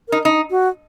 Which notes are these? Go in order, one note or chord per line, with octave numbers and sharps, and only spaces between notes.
D#4 A#4
D#4
F#4